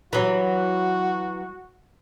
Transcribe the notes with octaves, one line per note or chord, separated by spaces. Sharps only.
E3 F#3 F#4